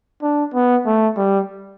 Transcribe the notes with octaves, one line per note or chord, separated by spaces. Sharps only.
D4
B3
A3
G3